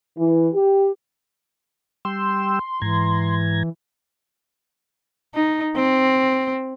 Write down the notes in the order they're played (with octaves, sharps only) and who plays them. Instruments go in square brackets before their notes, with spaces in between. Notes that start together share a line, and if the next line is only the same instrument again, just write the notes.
[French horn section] E3
G4
[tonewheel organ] G3 G5 E6 [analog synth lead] C6
[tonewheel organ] G#2 A#5 G#6 [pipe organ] E3
[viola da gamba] D#4
C4